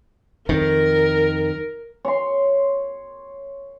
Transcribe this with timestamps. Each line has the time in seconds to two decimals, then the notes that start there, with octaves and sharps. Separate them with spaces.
0.49 F2 D#3 A#4
2.05 C#5 C6